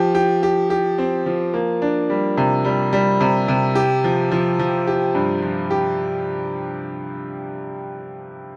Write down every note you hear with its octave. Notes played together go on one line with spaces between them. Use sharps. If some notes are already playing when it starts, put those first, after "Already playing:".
Already playing: F3 G4
G4
G4
G4
C4
F3
A#3
D4
G3
C3
G3
G3
C3
C3
G4
F3
F3
F3
G4
G2
F3
G4